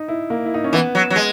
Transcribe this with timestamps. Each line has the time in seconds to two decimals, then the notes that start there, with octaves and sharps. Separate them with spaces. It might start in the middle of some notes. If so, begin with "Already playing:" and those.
Already playing: D#4
0.08 E4
0.30 A#3
0.45 E4
0.54 D#4
0.64 C#4
0.73 E3 B3
0.95 F#3
1.10 F#3
1.16 G#3